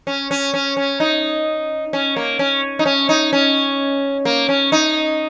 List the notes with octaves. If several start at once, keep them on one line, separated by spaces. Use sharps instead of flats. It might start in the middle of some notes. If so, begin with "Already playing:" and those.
C#4
C#4
C#4
C#4
D#4
C#4
A#3
C#4
D#4
C#4
D#4
C#4
A#3
C#4
D#4